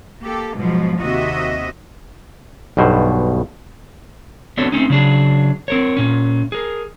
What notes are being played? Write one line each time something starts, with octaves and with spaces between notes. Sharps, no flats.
A#3 G4 A4
G#2 B2 F3 F#3
D#2 C3 F#4 D#5 E5
B1 G2 B2 C5
B3 C4 D4 F#4 A4 C#5
A3 C4 C#4 D#4
C#3 F#3 D4 G#4
C4 A#4 C#5
A#2 C#4
G#4 A#4